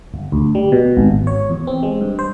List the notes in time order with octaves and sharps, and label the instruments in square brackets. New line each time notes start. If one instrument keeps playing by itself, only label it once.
[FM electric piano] G1
D2
G3
B2
G#1
G#1
C#5
E2
C4
G#3
G2
C5